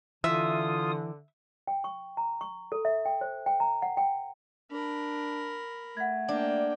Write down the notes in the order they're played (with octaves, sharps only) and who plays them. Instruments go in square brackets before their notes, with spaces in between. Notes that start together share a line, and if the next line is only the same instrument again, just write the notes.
[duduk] D3 [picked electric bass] E3 [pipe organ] F4 D#6 [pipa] E5
[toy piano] G5
C#6
A#5
C#6
A4
E5
G5
C5
G5
A#5
F#5
G5
[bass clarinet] D4 [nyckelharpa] A#4 B5
[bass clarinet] A3 [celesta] F#5 G#6
[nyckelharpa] A#3 G5 [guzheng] D4